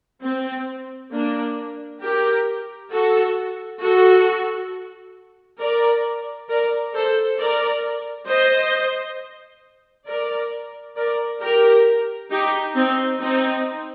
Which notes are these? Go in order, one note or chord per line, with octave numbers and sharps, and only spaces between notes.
C4
A#3 D4
G4 A#4
F#4 A4
F#4 A4
A#4 D5
A#4 D5
A4 C5
A#4 D5
C5 D#5
A#4 D5
A#4 D5
G4 A#4
D#4 G4
C4 D#4
C4 D#4